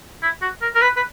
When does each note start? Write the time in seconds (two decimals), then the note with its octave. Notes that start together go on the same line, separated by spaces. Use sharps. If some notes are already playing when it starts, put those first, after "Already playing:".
0.23 E4
0.42 F#4
0.62 A#4
0.75 A#4
0.82 B4
0.97 B4